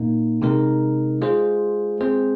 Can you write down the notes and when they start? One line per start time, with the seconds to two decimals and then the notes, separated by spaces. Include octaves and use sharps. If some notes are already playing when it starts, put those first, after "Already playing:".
Already playing: A#2 A#3 D#4
0.42 C3 G#3 D#4 A#4
1.22 G#3 F4 G#4 C5
2.00 G#3 C4 G#4 C5